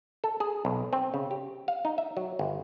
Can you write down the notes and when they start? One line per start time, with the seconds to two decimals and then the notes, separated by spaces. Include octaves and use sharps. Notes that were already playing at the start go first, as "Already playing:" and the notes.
0.24 A4
0.40 G#4
0.65 B1
0.93 C4
1.14 C#3
1.31 G4
1.68 F5
1.85 D#4
1.98 E5
2.17 F#3
2.39 G1